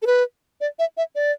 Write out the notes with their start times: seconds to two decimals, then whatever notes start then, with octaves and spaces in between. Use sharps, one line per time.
0.02 A4
0.07 B4
0.61 D5
0.79 E5
0.97 E5
1.15 D5